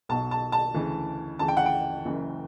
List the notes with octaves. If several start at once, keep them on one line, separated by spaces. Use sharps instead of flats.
B1 B2 A5
A5
A5
D2 C#3 E3
D2 C#3 E3 A5
G5
F#5
G5
F#1 F#2 E3